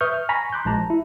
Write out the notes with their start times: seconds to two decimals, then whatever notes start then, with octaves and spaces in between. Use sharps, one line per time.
0.01 B4 E5 C#6 D#6 F6 G6
0.14 F6
0.29 G#5 A#5 B5 C#6 B6
0.53 C6 D6 F#6 G6
0.65 A#1 G#3 A5 A#5
0.90 E4